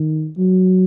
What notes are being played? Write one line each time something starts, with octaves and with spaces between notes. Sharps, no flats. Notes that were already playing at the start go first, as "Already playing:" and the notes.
Already playing: D#3
F#3